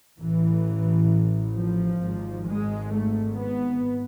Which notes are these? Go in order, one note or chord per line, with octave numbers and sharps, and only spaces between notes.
A1 A2 E3
F3
G#1 G#2
G#3
A3
B3